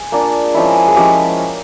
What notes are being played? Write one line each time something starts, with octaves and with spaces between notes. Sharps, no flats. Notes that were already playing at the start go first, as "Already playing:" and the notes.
Already playing: G#4
A#3 D4 F4
F3 G#3 C#4 E4
G#4
F3 G#3 C#4 E4 G4